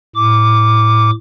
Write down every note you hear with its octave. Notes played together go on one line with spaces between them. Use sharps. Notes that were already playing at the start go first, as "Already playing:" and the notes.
A2 D6